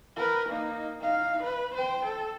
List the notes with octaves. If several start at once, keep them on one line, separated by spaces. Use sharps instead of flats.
A#4 B4
A#3 D#4
D#4 F5
B4
C5 G5
A4